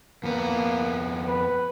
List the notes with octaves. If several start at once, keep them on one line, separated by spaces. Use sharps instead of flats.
F2 A#3 B3
B4